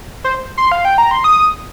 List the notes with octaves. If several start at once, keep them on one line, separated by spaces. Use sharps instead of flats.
C5
C6
F5
G5
A#5
C6
D#6